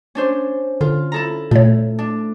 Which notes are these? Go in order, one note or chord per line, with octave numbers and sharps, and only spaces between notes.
C#4 D4 C5
D3 F4
E4 A4 A#5
A#2 A3 C#5
D4